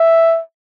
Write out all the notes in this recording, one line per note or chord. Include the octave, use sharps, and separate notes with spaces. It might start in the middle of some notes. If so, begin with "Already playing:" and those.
Already playing: E5